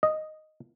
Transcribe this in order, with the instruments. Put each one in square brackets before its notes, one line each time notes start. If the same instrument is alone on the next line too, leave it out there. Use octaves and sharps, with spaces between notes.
[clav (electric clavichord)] D#5